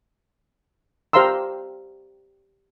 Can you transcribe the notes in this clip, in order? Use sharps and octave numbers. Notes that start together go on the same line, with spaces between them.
G4 C5 F5 A#5 C6 E6